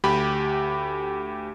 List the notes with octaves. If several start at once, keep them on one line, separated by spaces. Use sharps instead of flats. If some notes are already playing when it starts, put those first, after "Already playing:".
D2 G4 B5 D6